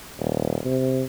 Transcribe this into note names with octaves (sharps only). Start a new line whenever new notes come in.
D#1
C3